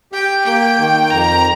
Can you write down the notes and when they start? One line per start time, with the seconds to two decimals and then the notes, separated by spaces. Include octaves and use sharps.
0.12 G4 G5
0.45 A#3 G5
0.78 D#3
1.11 F2 A#5